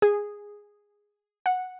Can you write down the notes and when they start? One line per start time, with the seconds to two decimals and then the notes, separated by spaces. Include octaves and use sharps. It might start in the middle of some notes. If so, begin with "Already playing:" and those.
0.02 G#4
1.46 F#5